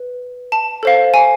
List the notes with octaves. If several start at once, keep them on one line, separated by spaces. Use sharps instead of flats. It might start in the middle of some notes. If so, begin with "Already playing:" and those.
Already playing: B4
A5
A4 C5 F5
G#5